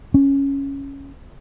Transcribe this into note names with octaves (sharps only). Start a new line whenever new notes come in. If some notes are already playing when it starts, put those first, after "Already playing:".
C#4